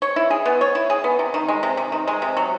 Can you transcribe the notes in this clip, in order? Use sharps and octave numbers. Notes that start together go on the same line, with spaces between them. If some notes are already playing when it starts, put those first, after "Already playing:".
C#5
E4
G#4
B3
C#5
E4
G#4
B3
C3
D#3
G#3
C3
C3
D#3
G#3
C3
F#3